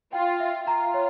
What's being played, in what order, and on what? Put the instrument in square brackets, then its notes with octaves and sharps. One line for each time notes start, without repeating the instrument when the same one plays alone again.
[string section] F4 [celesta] G5
[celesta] E5
[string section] F4 [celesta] A#5
[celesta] C#5